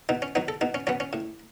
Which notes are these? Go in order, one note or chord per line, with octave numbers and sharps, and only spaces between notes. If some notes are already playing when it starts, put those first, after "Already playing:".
B2 D#4
C#4
F#3 B3 D#4
A4
B2 D#4
C#4
F#3 B3 C#4
C#4
A2